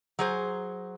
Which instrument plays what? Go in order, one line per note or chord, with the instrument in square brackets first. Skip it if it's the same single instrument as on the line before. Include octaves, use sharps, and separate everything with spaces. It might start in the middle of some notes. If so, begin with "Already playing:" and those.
[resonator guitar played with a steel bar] F#3 G#4 C5